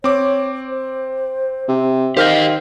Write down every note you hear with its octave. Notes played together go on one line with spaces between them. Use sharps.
C4 C#5 D6
C5
C3
D#3 G4 C5 D#5 F5 F6 G6